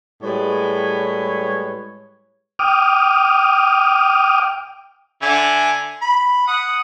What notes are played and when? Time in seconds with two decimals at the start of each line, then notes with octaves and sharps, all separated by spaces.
0.23 A2 G3 G#3 B4 C#5
2.59 G5 D6 D#6 F6
5.22 D3 E5 G#5
6.02 B5
6.48 F#5 D#6